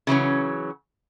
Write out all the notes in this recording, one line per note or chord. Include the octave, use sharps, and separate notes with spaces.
C#3 E3 F#3 C#4